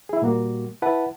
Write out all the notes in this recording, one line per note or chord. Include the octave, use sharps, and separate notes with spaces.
E4 G#4
A#2 G3 A#3 F#4
E4 B4 F#5 A5